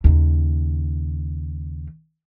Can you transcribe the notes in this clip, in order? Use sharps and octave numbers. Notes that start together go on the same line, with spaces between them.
D#2 C#3